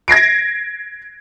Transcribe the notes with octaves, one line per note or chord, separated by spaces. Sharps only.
G#6 A#6 C7 D7